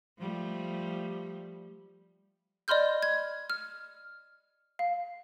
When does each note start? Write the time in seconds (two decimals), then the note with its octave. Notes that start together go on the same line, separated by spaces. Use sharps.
0.19 F3 G3 A3
2.68 D5 D#5 B5 C6 F6 G6
3.02 G#6
3.50 F6
4.79 F5